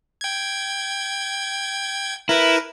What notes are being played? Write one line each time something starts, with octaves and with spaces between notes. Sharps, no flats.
G5 G#6
E4 A#4 B4